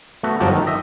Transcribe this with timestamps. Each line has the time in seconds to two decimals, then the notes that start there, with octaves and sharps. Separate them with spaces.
0.23 A3 B3 F#4
0.40 G1 F3 F#3 F#4 G4 A5
0.52 D#3 A3
0.67 D#5 E5